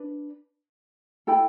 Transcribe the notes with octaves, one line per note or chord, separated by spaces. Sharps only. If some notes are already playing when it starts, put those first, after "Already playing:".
Already playing: D4 B4
E4 A4 G5 B5